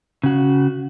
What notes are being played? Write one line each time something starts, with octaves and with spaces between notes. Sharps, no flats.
C#3 F#4